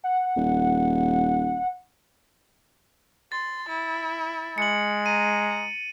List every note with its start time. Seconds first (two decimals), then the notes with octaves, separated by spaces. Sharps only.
0.04 F#5
0.36 D#1
3.32 C6 A6
3.69 E4
4.58 G#3 C#7 F#7
5.06 A#5 D#7